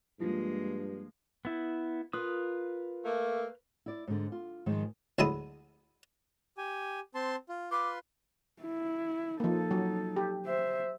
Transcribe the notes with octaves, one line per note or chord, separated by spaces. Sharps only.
G2 F3 G#3 A#3
B3 E4
F4 A#4 B4 D#6
A3 A#3
E4 D5
G#2 D3
F4
G#2 D#3 F3 G#3
D2 F#3 G#3 E4 A5 D#6
G4 G#5
C4 A5 C6
F4
F4 B4 C6 D6
E4
F3 A#3 D#4 A4
F#3
G4
C5 E5